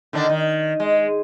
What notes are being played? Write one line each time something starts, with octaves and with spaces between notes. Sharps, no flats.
D3 D#3 D4
D#3
G#3